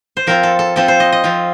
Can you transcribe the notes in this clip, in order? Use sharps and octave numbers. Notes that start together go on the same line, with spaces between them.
C5
F3 C4 F4 A#4
A4
A4
F3 C4 F4 A4
C5
D#5
D#5
F3 C4 F4